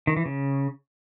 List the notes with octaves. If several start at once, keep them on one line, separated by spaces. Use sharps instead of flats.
D#3
E3
C#3